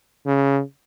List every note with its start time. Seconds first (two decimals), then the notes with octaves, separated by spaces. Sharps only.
0.26 C#3